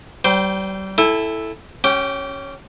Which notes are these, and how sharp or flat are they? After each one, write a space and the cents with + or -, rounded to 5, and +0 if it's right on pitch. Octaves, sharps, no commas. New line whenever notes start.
G3 -35 C5 -20 G5 +0
E4 +0 A4 +0 G#5 -45
C#4 -5 G4 -35 G5 +0